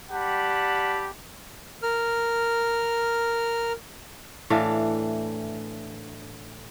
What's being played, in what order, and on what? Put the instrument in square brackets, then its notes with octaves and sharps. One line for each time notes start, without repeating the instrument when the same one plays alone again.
[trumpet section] G3 G4 F#5 A5 B5
[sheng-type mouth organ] A#4 F6
[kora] A2 E3 D4 F5